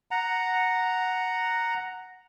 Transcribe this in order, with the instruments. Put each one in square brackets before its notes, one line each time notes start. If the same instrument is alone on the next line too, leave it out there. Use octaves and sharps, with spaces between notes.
[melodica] F#5 A#5